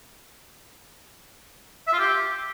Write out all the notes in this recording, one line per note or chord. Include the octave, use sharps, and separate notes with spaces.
E5
F4
G4